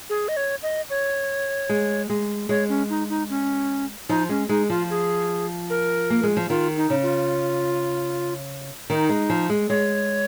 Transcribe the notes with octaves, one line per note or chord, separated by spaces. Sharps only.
G#4
D#5
C#5
D#5
C#5
G#3
G#3
G#3 C#5
C#4
D#4
D#4
C#4
F3 D#4
G#3 C#4
G#3 D#4
F3 F4
G#4
A#4
A#3
G#3
F3
D#3 F4
D#4
C#3
F4
D#3 D#4
G#3
F3
G#3
G#3 C#5